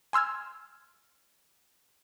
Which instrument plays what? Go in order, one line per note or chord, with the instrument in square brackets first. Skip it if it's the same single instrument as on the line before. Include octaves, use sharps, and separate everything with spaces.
[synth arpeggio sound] G#5 C6 E6 F6 G#6